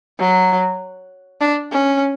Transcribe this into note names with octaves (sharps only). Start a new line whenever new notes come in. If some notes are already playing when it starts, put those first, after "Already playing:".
F#3
D4
C#4